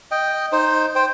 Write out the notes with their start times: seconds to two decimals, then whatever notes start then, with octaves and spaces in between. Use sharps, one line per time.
0.11 D#5 G5
0.52 D#4 C5
0.95 C5 G5